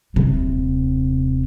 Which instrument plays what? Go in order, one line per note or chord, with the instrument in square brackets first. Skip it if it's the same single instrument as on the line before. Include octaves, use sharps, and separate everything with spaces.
[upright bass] D#1 C3